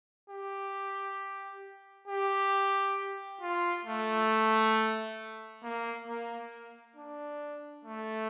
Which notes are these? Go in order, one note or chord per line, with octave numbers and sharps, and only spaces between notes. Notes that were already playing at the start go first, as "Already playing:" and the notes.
G4
G4
F4
A3
A#3
A#3
D4
A3